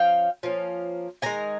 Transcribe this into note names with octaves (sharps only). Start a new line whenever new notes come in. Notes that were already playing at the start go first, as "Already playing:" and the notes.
Already playing: F3 C#4 F5 G5
F3 A#3 C#4
C3 D#3 G#3 G#5 A#5